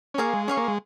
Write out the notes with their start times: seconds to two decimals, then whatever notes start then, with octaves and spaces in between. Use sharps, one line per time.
0.14 C#4
0.18 A#3 G#4 F5 C#6
0.33 G#3
0.48 C#4 G#4 F5 C#6
0.57 A#3
0.68 G#3